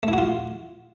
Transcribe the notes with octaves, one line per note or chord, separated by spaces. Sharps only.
A3
E4
F#4
F4